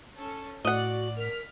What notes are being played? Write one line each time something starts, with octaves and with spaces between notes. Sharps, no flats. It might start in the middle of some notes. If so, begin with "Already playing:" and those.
C#4 A4
A2 F#4 D5 D#5 F#5 F#6
A#4 F6 B6